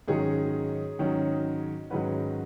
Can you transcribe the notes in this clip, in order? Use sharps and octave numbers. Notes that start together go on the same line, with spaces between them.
G#2 D#3 F#3 C#4 G#4 C#5
G#2 D#3 F#3 C#4
G#2 D#3 F#3 C#4 F#4 B4